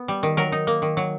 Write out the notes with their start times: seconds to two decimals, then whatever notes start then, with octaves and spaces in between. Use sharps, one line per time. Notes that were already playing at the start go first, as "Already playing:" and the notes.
Already playing: B3
0.08 G3
0.23 D#3
0.37 F#3 A#4
0.52 D#4
0.67 A#3
0.82 D#3
0.97 F#3